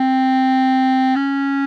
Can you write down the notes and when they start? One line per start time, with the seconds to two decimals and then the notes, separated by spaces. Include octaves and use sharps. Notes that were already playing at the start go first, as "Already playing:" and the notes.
Already playing: C4
1.16 C#4